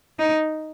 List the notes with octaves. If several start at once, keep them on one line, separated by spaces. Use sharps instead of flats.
D#4